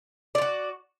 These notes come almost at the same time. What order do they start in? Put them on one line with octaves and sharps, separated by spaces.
D5 F4 F#4